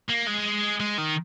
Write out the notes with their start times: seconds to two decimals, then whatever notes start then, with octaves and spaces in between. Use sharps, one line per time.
0.10 A#3
0.27 G#3
0.80 G#3
0.98 D#3